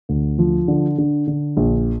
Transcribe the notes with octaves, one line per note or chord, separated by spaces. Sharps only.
D2
F3
D3
D3
D3
A#1